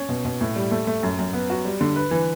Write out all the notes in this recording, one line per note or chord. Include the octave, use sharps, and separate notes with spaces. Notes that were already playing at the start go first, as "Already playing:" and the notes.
Already playing: C#4
B2
B2
A2
G3
A3
A3
F#2
F#2
B3
F#4
G3
D3
B4
E3